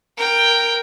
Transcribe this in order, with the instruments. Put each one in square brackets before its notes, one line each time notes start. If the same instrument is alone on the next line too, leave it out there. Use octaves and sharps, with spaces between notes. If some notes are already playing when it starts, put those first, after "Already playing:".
[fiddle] A#4 G5